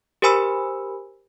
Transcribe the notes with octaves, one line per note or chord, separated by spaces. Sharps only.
G4 A#4 C5 G#5 B5 E6